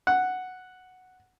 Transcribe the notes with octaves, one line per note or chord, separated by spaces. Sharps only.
F#5